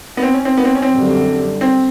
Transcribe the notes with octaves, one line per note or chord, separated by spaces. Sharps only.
B3
C4
C#4
C4
B3
C4
C#4
C4
F#2 D3 G3
C4